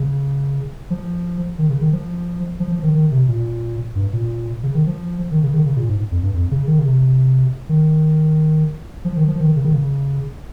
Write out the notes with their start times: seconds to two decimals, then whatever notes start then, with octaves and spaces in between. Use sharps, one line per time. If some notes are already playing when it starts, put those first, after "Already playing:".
Already playing: C#3
0.90 F3
1.58 D#3
1.69 C#3
1.81 D#3
1.92 F3
2.60 F3
2.72 F3
2.83 D#3
2.95 D#3
3.11 C3
3.28 A#2
3.95 G2
4.13 A#2
4.63 C#3
4.74 D#3
4.87 F3
5.31 D#3
5.43 C#3
5.54 D#3
5.66 C#3
5.77 A#2
5.88 G#2
6.11 F2
6.23 G2
6.34 F2
6.51 C#3
6.67 D#3
6.79 C#3
6.85 C3
7.69 D#3
9.05 F3
9.16 D#3
9.28 F3
9.40 D#3
9.56 C#3
9.65 D#3
9.73 C#3